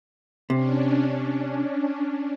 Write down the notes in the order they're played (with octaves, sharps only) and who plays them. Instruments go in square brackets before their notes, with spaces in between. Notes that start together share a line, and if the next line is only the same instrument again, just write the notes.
[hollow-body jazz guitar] C3 [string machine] C#4 D4